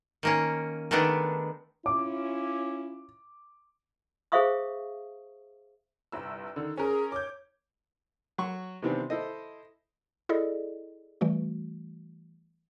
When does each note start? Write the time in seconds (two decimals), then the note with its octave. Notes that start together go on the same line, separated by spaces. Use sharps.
0.23 D#3 A#3 C#4
0.91 D#3 G#3 A3 B3 D4
1.86 C#4 E4 F4 D6
4.32 G#4 C5 E5 F5 C#6 D#6
6.12 G1 C2 E6
6.56 D3 D#3
6.78 C#4 G#4 A#4
7.12 C#5 D6 G6
8.38 F#3 F#4 C#6
8.82 C3 D#3 E3 B3 C4 D4
9.10 E4 A4 C5 D#5
10.29 E4 G#4 A4 D5 D#5
11.21 E3 G3 A3 F#4